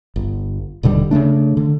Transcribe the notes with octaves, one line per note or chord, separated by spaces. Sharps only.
G1
D#1 B2 D3 G3
C#3 F#3 A3 D4
D3